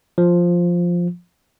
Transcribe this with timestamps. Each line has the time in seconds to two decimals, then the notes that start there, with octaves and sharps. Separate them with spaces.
0.18 F3